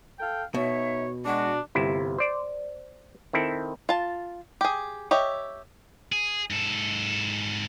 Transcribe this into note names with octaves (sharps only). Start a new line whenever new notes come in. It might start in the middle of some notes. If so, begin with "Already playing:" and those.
A4 F5 G5
B2 D#4 C#5 E5
G#3 D4 F#4
G1 C3 E4
C5 D5
D#3 C4 E4 A4
F4 A5
G4 G#4
G4 C#5 D#5 E5
G#4
G#2 A4